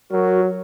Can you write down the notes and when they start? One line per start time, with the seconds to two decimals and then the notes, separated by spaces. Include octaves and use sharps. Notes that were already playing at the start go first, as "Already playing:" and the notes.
0.12 F#3 F#4 A#4